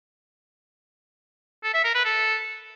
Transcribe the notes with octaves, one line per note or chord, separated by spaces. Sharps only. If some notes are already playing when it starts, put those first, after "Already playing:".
A4
E5
A#4
B4
A4